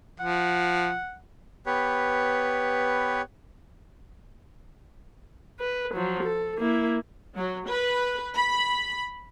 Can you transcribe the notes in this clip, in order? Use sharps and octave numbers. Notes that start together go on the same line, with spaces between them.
F3 F#5
B3 G4 B4 C#5
B4
F3 F#3
A4
A#3 E4
F#3
B4
B5